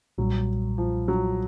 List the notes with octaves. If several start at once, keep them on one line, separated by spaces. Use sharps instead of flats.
B1 A#2 F#3 G3
F3
F#3